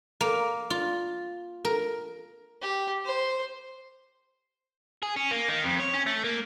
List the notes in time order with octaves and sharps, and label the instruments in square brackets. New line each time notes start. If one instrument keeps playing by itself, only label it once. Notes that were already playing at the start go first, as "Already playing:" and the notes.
[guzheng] A#3
F4
A#4
[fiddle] G4
C5
[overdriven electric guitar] G#4
C#4
A#3
D#3
F2
C#5
C#4
A3
A#3